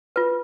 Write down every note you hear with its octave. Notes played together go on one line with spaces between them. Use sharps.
F4 B4